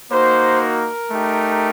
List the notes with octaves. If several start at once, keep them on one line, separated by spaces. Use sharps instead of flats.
A#3 D#4 F#4 C5
A#4
A3 D#4 G4